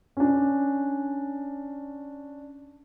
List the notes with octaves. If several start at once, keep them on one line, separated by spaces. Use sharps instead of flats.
C#4 D4